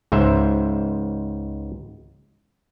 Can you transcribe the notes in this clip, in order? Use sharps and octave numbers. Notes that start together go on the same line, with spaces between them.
C#2 G#2 C5 E5